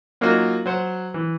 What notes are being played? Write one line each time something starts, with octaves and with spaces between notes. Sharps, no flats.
F#3 A#3 C#4 D#4 F4 F#4
F#3 C5 F#5
E3